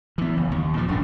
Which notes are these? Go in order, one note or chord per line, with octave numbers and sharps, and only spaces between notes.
E3 B3
F#1
D#2
A#2 F3
E1 F#2 A2 D4